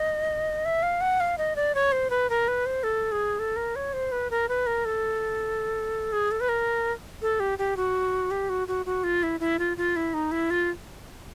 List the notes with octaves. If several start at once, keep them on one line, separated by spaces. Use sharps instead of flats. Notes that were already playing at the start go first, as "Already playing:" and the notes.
Already playing: D#5
E5
F5
F#5
F5
D#5
D5
C#5
C5
B4
A#4
B4
C5
A4
G#4
A4
A#4
C#5
C5
B4
A#4
B4
A#4
A4
G#4
A4
B4
A#4
A4
G4
G4
F#4
G4
F#4
F#4
F#4
F4
E4
E4
F4
F4
E4
D#4
E4
F4